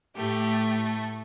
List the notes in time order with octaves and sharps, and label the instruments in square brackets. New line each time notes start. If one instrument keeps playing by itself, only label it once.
[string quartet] A2 A3 G4